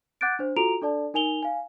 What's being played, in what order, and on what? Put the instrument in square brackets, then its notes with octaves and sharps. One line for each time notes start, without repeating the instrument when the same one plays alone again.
[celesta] F#5 D6 F#6 G6 A6 D7
D4 C5
F4 F#4 A4 A#5 D7 F7
D4 A4 D5 A5
D#4 A#4 G#5 F7 G7
F5 G#5